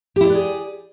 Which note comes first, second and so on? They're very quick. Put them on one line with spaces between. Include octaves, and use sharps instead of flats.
G4 E4 D5 B4 G#4